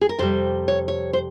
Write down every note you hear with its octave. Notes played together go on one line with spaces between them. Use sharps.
G#4
A#4
F2 C3 G3 C5
C#5
C#5
C5